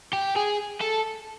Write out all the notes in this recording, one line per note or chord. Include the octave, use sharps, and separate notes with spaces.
G4
G#4
A4